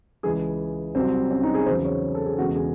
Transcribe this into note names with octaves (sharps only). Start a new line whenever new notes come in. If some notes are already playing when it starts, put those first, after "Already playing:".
C#2 C#3 E3 G#4
C2 C3 F#3 C4
C#4
D#4
G#4
E2 C#3 F#3 C5
C#5
A4
G#4
E1 E2 C#3 F#4
G#4